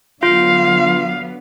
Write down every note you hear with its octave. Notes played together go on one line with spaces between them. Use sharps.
D3 F#3 B3 F4 F5